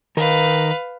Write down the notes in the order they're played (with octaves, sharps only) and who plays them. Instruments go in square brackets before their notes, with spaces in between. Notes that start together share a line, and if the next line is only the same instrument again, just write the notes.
[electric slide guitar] D#3 A#4 [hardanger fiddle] B4 F5